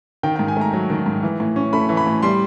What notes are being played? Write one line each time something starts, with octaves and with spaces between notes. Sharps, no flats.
D#3 G5
G#2 G5
G#5
A3 A#5
F#3
D#3
G#2
E3
A2
C#4
A3 B5
E3
B5
A2
G3 C6